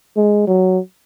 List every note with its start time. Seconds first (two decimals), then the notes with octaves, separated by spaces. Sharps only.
0.17 G#3
0.47 F#3